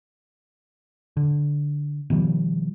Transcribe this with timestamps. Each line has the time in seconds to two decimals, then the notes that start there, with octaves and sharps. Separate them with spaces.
1.17 D3
2.10 B2 D#3 F3 G3